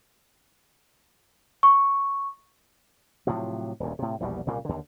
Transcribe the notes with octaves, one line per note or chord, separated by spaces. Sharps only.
C#6
A2 C3 F3 F#3
D#1 D2
A2 C3
A#1 E2 B2 G3
C2 A#2 C#3 A#3
D#2 D3